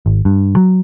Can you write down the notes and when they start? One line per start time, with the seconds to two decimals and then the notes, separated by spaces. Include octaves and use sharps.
0.06 G#1
0.25 G2
0.56 F#3